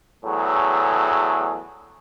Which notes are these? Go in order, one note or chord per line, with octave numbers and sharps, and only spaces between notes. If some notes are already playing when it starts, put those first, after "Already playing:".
E2 A2 F#3 G#4 A4